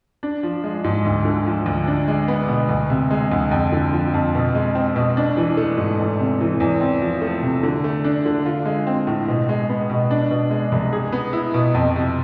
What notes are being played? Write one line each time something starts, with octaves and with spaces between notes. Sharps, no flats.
D4
F3
G#3
G#2
D2
D3
F3
D2
D4
G#3
B3
B2
D2
C3
G#3
D2
F2
D3
F3
F2
B2
G#3
C4
B2
D4
E3
A3
G#2
E2
C3
E3
E2
C4
F3
A3
C3
D3
A3
D4
D3
F4
G#3
C4
A2
B2
G#3
B3
B2
D4
B2
G#3
C2
G#4
B3
E4
B2
F2
C3